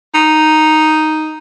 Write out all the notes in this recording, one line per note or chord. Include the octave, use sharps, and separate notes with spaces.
D#4